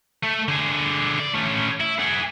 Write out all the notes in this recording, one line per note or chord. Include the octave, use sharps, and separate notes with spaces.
A3
D3 G#4
D5
A3 C#4
E4
G#4 F#5